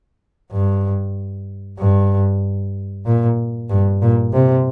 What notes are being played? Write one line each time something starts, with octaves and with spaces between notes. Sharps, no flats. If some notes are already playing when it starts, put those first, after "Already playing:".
G2
G2
A#2
G2
A#2
C3